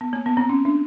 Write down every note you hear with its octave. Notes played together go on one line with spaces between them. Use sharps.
B3
A#3
B3
C4
C#4
D4